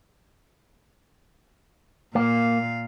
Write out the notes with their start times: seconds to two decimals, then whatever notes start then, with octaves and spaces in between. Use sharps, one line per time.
2.15 A#2 A#3 F5